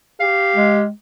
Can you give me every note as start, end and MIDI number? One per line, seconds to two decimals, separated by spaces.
0.20 0.85 67
0.20 0.83 77
0.55 0.90 56